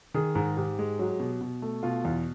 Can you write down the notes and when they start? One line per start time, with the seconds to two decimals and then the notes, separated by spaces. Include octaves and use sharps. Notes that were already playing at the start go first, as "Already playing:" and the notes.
0.14 D#3 G#4
0.35 G#2
0.57 G#2 G4
0.79 G#3
0.99 F#3
1.20 B2
1.41 B2
1.62 A3
1.83 B2 F4
2.05 E2